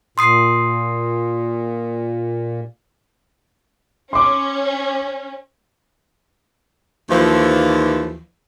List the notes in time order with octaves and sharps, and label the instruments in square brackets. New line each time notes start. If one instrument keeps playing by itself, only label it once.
[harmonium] A#2 [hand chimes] C6 D#6 C7
[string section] C#4 [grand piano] C6 D6
[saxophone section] D#2 E3 F3